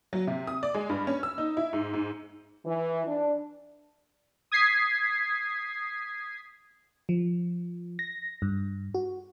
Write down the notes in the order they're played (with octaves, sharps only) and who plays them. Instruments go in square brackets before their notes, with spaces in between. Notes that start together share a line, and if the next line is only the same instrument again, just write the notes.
[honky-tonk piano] F#3
C3
D#6
D5
G#3
G2
C#4
E6
D#4
E4
G#2
G#2
[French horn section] E3
D4
[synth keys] D#6 G#6 B6 C7
[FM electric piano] F3
A#6
G2
F#4